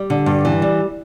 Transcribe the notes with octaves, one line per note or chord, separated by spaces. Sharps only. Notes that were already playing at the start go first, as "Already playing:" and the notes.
Already playing: G3
D3
G2
E3
G3